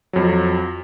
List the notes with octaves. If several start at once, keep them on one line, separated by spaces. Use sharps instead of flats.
F2 F#3